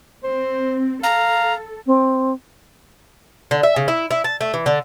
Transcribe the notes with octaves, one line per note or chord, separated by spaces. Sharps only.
C4 C5
A4 F5 A#5
C4
D3
E5
C#3
E4
E4
A5
A3
E3
D3